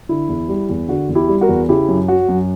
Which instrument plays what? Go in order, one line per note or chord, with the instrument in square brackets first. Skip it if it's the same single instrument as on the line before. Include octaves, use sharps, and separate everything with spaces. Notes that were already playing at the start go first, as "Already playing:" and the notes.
[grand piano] D3 E4
E2
G3
E2
D3 F#4
E2
E4 G4
G3
F#4 A#4
E2
C#3 E4 G4
F#2
F#3 F#4
F#2